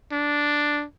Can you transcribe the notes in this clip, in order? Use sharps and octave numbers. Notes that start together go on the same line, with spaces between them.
D4